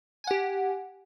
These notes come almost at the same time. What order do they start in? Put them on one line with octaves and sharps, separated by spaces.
G#5 F#5 G4